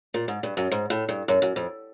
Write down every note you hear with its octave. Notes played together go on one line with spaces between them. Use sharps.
A#2
G#2
G2
F#2
G#2
A2
G2
F#2
F#2
F2